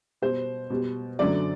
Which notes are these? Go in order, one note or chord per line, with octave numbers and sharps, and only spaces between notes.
B2 G3 C5
B2 G3
F#2 D3 F#3 A3 D5